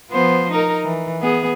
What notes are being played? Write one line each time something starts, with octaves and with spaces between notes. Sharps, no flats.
F3 B3 C5
D#4 A#4
E3
B3 G#4